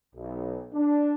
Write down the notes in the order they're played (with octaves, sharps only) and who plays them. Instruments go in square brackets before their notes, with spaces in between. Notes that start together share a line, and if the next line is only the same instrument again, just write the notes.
[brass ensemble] B1
D4